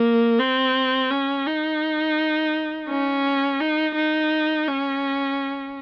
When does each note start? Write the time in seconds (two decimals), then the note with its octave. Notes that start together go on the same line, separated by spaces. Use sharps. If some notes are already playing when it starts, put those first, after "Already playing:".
Already playing: A#3
0.39 C4
1.11 C#4
1.46 D#4
2.89 C#4
3.61 D#4
3.95 D#4
4.68 C#4